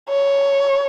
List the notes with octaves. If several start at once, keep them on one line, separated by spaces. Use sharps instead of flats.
C#5